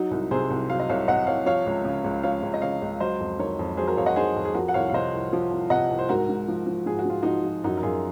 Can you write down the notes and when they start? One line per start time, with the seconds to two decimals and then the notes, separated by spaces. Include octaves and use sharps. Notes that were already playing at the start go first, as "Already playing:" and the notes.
Already playing: F#3 D#4 F#4
0.11 C2
0.31 C3 G#4 C5
0.50 C2
0.69 F#3 F5
0.80 D#5
0.89 C2 C#5 F5
1.08 C3 D#5 F#5
1.27 C2 C#5 F5
1.46 F3 C#5 F5
1.66 C#2
1.85 C#3
2.04 C#2
2.23 F3 C#5 F5
2.43 C#2
2.54 D#5
2.62 C#3 C#5 F5
2.82 C#2
3.00 F#3 C5 D#5
3.20 F2
3.39 D#3 A#4 C#5
3.59 F2
3.77 F#3 G#4 C5
3.87 F#4 A#4
3.97 F2 C#5 F5
4.06 D#5 F#5
4.16 D#3 G#4 C5
4.36 F2
4.45 G#4
4.54 F3 F#4 A#4
4.68 F#5
4.74 C2 C#5 F5
4.89 F5
4.93 C3 C5 D#5
5.13 C2
5.33 F3
5.51 C2
5.70 C3 D#5 F#5
5.90 C2
5.99 C5
6.09 G#2 F#4 A#4
6.29 G#2
6.48 F3
6.67 F3
6.86 G#2 G#4
6.99 F#4
7.05 G#2 F4
7.22 F3 D#4 F#4
7.45 F3
7.64 F#2 D#4 F#4
7.78 A#4
7.83 F#2 F4 G#4